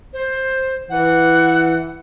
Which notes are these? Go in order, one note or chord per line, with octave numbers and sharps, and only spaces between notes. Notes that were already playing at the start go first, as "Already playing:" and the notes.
C5
E3 F#5